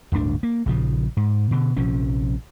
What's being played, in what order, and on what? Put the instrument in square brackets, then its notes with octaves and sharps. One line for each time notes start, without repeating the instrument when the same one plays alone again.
[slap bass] D1 G1 D2 D4
A#3
A#1 C#3 F3
G#2
B2 D3
A#1 C3 F3 C#4